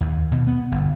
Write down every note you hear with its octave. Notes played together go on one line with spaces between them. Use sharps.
D#2
B2
B3
G1